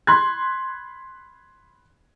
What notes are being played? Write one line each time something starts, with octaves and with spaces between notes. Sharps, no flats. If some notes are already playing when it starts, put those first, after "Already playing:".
B5 C6 F#6 G#6